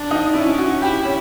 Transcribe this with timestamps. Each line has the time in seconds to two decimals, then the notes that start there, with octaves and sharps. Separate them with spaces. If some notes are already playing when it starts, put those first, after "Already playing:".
Already playing: D4
0.11 D#4
0.34 C#4 E4
0.58 F#4
0.82 E4 G4
1.05 C#4